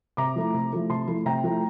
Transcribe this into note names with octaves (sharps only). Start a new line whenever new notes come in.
C3 A#5 D6
F3 A3 E4
C3
F3 A3 E4
C3 A5 C6
F3 A3 E4
C3 G5 A#5
F3 A3 E4